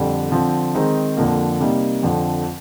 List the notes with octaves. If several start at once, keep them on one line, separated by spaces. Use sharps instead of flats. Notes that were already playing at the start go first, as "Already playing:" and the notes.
Already playing: F2 D3 G3
D3 F3 C4
D#3 G#3 C4 D#4
F2 D3 F3 A#3
C3 G3 A#3 D#4
F2 D3 F3